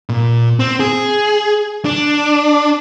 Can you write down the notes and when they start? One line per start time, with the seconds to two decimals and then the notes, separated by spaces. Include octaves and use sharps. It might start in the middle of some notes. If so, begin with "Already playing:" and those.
0.09 A#2
0.59 C4
0.80 G#4
1.85 D4